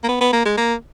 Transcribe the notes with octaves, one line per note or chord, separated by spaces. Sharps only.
A#3
B3
B3
A#3
G#3
A#3